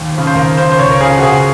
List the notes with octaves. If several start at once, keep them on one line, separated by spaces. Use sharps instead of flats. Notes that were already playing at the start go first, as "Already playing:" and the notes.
Already playing: D#2
C#3 F3
C5
D#2 A#4
C#3 F3 C5
C5
C#2 C#5
A#4
C#3 F3 G#4
F#4
C#2 G#4